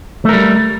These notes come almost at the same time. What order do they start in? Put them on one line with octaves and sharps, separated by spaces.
A3 A#4 G3